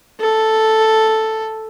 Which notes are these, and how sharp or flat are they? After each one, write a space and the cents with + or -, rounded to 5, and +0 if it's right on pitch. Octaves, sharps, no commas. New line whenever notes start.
A4 +0